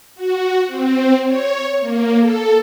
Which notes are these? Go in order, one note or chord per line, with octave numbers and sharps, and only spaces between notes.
F#4
C4
C#5
A#3
A4